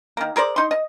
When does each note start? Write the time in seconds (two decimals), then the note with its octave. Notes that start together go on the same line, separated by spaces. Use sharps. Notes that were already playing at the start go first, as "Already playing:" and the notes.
0.17 D#3 A#3
0.36 G#4 A#4 C5 D5
0.56 D#4 C6
0.71 D#5